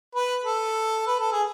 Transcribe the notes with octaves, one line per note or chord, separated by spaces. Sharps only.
B4
A4
B4
A4
G#4